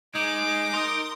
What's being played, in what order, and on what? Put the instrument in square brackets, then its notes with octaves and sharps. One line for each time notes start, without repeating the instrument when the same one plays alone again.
[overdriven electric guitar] G#3 [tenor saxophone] D#4 [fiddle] D6
[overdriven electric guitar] A#4 [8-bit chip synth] C6 D#6